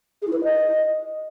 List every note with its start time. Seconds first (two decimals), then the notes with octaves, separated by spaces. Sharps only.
0.22 G#4
0.27 E4
0.32 B4
0.38 E4
0.43 D#5